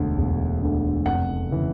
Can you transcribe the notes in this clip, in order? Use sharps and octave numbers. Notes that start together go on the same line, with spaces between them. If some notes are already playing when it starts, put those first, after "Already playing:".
Already playing: E1 D2 D3
E1
D2 D3
F1 F#5
C#3 E3